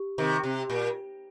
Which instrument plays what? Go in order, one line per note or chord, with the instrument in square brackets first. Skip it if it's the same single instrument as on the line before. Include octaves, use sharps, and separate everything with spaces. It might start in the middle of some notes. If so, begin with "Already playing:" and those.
Already playing: [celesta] G4
[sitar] C3 D#3
C3
A#2